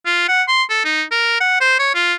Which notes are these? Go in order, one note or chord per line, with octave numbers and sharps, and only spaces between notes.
F4
F#5
C6
A4
D#4
A#4
F#5
C5
C#5
F4